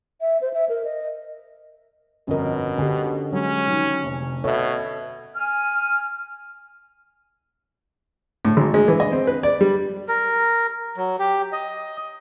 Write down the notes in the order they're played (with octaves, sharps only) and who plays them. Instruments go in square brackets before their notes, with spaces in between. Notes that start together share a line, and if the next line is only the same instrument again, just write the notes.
[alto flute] E5
C5
E5
A#4
D#5
[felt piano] G1 F2 D#5 [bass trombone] B2 [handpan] C#4 A#4
[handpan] D3 G4 [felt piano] C#4
[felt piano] F#3 G#3 [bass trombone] C#4
[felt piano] D#3 F#3
F1
[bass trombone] B2 [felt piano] A4 E5 [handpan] C#5
[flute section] G#5 F6
[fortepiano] A2
G#1
G#3
E3
D#5
C4
B4
D5
G3
[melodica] A#4
F#3
G4
D#5